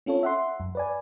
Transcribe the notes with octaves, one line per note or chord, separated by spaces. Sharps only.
C4 C#4 F4 A4 C#5
E5 F#5 C6
F#2
B4 D5 G#5